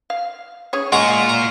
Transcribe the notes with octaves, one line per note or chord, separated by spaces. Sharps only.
F5
C#4 G#4 C#5
A#2 G#3 F4 F#5 A#5 C#6
A#5